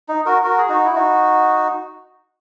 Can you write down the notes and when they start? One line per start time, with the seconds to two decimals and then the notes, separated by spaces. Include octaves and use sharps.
0.09 D#4
0.26 F#4 A#4
0.43 F#4 A#4
0.58 G#4
0.69 D#4 F#4
0.85 E4
0.95 D#4 F#4